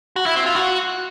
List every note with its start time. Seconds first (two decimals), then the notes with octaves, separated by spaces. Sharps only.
0.16 F#4
0.26 E4
0.36 C4
0.46 F4
0.56 F#4